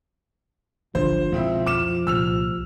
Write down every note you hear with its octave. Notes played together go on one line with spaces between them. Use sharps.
G1 D3 F3 C5
C#2 B2 C4 E4
F2 D6 F6 E7
C2 A#2 E6 F6 F7